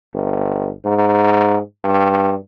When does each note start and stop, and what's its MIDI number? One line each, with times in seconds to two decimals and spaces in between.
0.14 0.71 31
0.85 1.59 44
1.84 2.36 43